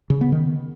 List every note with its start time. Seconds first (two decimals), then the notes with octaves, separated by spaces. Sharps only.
0.10 C#3
0.21 B3
0.32 D#3